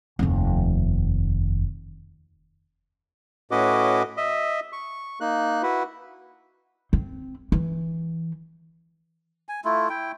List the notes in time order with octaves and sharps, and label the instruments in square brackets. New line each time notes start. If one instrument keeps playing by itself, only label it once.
[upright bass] F1 D#2
[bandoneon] A2 C#4 F#4 B4 D#5 D6
D#5 E5
C#6
A#3 D#4 F#6
E4 F#4 B4
[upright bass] C4
E3
[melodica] G#5
A3 E4 F4
E4 G5